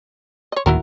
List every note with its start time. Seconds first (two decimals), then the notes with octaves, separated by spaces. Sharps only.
0.52 C#5 D#5
0.66 D1 D#2 D#3 E4 F#4 A#4